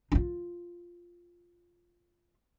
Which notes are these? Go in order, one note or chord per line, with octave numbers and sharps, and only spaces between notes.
D#4 F4